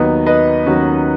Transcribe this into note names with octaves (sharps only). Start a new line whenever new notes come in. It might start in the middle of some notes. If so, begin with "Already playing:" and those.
Already playing: D#2 D#3 F#3 B3 D#4
B4 D#5
D#2 D#3 F#3 C#4 F#4